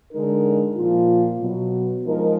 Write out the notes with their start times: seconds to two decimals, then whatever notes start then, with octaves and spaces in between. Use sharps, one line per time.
0.11 D3 G#3 D#4 A#4
0.75 A#2 F3 A#3 F4
1.39 B2 F#3 B3
2.04 F3 G#3 D#4 A#4